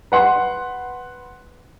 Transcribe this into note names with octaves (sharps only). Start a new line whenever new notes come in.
B4 F#5 C6